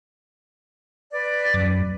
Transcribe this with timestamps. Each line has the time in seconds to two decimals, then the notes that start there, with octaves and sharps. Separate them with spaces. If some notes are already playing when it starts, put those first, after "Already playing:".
1.12 B4 D5
1.54 F#2